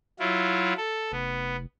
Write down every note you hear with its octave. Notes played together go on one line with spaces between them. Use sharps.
F#3 E4 F4
A4
F1 B3